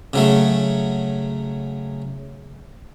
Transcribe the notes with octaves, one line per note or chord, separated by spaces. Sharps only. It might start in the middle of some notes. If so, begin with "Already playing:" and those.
C#3 F#3 A3